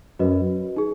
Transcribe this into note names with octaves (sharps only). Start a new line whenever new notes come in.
F#2 F#4 B4 D#5
D#4 G#4